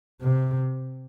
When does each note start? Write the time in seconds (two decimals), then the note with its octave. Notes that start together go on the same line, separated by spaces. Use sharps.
0.22 C3